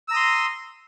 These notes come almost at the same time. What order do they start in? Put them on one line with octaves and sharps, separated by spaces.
E6 A#5 D#6 C6